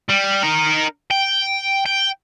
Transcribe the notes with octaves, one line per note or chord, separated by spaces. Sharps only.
G3
D#4 A#4
G5
G5